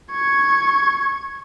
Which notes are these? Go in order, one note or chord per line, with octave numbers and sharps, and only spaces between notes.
C#6 G#6